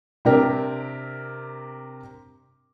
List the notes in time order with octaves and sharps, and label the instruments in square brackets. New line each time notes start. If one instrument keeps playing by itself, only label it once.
[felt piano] C3 C4 D4 G4 A#4